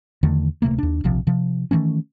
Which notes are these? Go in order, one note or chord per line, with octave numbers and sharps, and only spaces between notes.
E2 D3 D#3 A3
D1 C3 A3 A#3
D#2 D4
D1 A#1 C3 F3
C3 F3
D#3 E3 A3 C#4